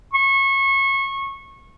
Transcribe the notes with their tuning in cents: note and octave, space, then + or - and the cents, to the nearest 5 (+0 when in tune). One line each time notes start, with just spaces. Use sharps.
C#6 -25